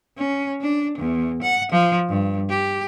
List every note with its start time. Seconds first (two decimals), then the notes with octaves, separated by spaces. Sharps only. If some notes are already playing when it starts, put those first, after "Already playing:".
0.17 C#4
0.61 D4
0.98 E2
1.42 F#5
1.71 F3
2.09 G2
2.50 G4